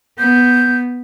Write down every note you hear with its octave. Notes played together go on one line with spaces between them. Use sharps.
B3 G6